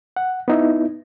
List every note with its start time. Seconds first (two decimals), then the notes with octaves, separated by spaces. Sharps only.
0.16 F#5
0.48 B3 D#4 E4